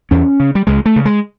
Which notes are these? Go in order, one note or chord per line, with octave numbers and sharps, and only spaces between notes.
E2 C#4
C#3
G3
C#2 G#3
A3
C#3
G#3